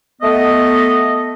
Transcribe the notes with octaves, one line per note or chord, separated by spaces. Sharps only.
A3 B3 D#5